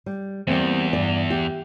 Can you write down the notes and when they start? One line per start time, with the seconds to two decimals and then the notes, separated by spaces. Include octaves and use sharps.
0.06 G3
0.47 E2 G3 A#3 C4
0.93 G2 D5
1.30 G4